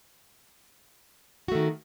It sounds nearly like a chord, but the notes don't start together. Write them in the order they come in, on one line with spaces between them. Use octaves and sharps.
F#4 A3 D#3